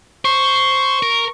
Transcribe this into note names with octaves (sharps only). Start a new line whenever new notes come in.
C5 C#6
A#4